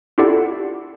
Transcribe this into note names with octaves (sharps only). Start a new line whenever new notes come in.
E4 F4 G4 A4 D5 F#5